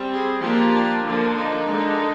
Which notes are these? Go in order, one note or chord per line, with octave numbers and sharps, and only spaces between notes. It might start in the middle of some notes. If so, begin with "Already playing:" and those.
Already playing: G3 C4
G#4
F3 A#3 D4 G4
D4
D3 F3 A#3 D4
D#4
D3 G#3 D4